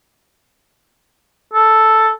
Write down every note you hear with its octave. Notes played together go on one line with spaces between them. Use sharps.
A4